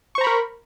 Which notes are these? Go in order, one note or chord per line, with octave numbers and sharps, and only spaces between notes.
A#4 C5 A#5 B5 C#6